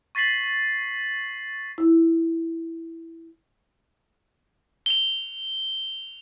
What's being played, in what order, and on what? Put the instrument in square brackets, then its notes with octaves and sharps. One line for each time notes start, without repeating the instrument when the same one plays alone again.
[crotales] C#6 A6 B6 C7 F#7
[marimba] E4
[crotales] F7 G7